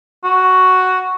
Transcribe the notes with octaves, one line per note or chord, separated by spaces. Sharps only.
F#4